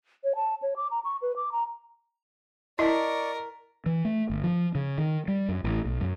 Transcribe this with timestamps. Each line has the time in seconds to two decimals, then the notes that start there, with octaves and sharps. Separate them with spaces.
0.24 C#5
0.36 A5
0.62 C#5
0.76 D6
0.91 A#5
1.05 C#6
1.22 B4
1.36 D6
1.52 A#5
2.79 E4 A#4 D5 D#5 A5 C#6 B6
3.86 E3
4.05 A3
4.30 G1
4.44 F3
4.75 C#3
4.98 D#3
5.28 G3
5.49 F#2
5.64 A1
5.85 B1
6.01 F#2